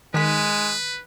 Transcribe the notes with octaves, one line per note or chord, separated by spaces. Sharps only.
D#3 G#3 B4 B6